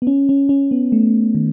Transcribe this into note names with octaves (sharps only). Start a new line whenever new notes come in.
B3
C#4
C#4
C#4
B3
A3
D#3